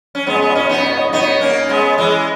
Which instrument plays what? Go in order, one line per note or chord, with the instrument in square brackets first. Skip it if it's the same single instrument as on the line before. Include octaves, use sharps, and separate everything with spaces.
[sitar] C#4
[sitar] G#3 B3 [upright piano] C#5
[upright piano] D#5
[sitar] B3 [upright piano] C#5
[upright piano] D#5
[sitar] C#4 [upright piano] C#5
[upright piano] D#5
[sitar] B3 D#4 [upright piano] C#5
[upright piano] D#5
C#5
D#5
C#5
[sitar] B3 D#4 [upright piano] D#5
[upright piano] C#5
[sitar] A#3 C#4
G#3 B3
[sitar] E3 G#3 [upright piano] D#5